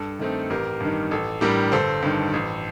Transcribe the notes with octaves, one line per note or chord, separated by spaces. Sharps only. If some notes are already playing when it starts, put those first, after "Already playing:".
Already playing: G2 A4
D#3 A3 C4 D#4
A1 G4 A#4
G2 D#3
A1 A4
A2 G3 D4 G4 A#4
G1 A4 C5
G2 D#3
A1